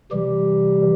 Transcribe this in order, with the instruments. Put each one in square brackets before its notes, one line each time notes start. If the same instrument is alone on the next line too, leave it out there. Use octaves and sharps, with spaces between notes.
[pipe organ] C3 E3 G3 G4